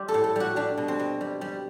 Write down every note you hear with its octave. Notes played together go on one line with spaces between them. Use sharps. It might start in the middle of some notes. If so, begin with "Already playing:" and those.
Already playing: G3 C5 D5
A4
A2
A4
G3 F#4
G3 D4
B2
C4
B2
G3
G3